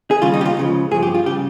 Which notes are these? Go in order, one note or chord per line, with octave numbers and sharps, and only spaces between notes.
G#4
D#2 C#3 G3 F4
D#4
G4
F4
C#2 C#3 F3
G2 F3 G#4
G4
F4
C#3 G3 G4